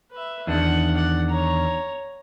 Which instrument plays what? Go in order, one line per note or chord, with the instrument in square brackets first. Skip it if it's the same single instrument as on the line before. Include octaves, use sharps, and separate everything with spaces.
[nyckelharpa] B4 E5
[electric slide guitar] E2 D#3 D4 [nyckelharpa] F#5
[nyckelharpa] D5 F#5
C#5 A#5